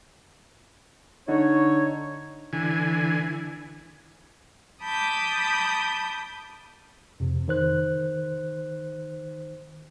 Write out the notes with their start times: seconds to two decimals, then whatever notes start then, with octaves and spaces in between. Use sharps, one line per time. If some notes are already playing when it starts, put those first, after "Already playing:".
1.28 D3 D#4 C#5
2.53 D3 E3 G#5
4.84 A5 B5 D6 D#6 G6
7.20 F2 C3
7.48 D#3 C5 F#6